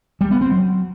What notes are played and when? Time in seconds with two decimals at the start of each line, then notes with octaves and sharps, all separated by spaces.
0.21 G3
0.31 B3
0.41 C4
0.51 F#3